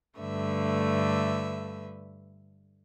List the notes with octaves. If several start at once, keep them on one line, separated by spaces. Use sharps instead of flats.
G2 D3 A3 B4 E5